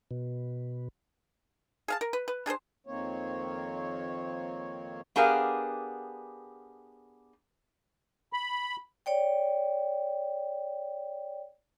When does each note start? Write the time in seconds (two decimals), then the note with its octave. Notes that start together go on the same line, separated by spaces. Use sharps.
0.11 B2
1.88 G#4 F5 A5
2.01 A#4
2.13 B4
2.28 B4
2.46 D4 G#4 A#4 C5
2.87 F2 D#3 A#3 C4 C#5
5.16 B3 D4 G4 G#4 A#4 F5
8.33 B5
9.06 C#5 D5 G5